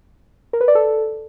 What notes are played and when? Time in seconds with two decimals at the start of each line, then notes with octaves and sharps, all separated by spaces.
0.53 A#4
0.61 B4
0.68 D5
0.75 A4